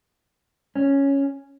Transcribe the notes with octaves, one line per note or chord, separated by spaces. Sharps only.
C#4